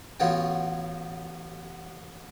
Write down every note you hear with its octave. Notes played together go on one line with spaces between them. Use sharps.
A1 B3 F4 F#4 C#5 G5